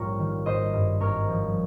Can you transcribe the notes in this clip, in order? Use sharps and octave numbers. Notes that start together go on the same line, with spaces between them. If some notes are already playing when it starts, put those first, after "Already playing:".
Already playing: A#1 G#2 G3 F4 A#4 C#5
D#3
G#1 C5 D#5
G2
G#1 A#4 C#5
F3